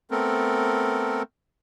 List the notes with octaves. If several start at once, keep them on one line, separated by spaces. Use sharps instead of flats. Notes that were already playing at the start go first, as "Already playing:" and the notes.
A3 B3 C4 A4 A#4